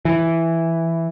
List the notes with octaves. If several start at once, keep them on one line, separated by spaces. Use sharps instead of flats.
E3